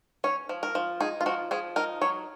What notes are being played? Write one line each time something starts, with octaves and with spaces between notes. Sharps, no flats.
C#4 C#5
F3
A#4
F3
D#4 G#4
F4
F3 F#4
F3 G#4
D#4 A#4
F#3 C#5